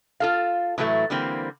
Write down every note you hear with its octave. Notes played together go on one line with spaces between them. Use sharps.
F4 A4 F5
A2 E3 F#3 G3 A3
D3 E3 G3 A#3 C4